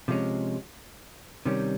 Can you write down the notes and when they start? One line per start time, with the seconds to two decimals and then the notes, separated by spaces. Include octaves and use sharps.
0.08 C3 F3 G#3 C#4
1.45 C3 D#3 G3 C#4